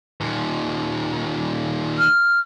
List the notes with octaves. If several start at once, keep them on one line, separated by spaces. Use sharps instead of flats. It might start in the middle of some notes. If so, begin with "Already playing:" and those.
D#2 A#2
F6